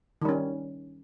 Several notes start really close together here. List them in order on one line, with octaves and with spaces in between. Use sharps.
D#3 G3 C#4